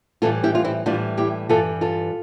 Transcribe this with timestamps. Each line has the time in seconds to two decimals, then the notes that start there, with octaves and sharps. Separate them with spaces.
0.22 A2 E3 G3 F4 A4
0.43 E4 G4
0.55 F4
0.64 C4 E4
0.86 A2 E3 G3 D4 F4
1.17 E4 G4
1.49 G2 E3 G3 F4 A4
1.81 F4 A4